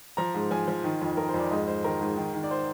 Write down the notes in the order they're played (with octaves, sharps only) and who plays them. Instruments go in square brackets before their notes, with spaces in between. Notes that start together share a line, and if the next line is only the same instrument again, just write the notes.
[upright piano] F3 A#5
G#2
F3 G#5
F3
D#3
F2
F2 A#4
C5
F2
D5
G#2 D#5
G#2 C5
D#3 A#4
G#2
D#3
D#3
D5
C5